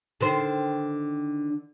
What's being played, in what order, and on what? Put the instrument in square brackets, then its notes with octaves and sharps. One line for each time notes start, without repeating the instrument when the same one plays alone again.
[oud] D3 D#3 C5